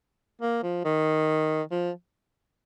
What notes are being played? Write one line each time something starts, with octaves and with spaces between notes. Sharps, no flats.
A#3
F3
D#3
F3